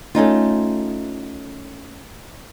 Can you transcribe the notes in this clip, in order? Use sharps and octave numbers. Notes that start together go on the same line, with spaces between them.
A3 C#4 D#4 F4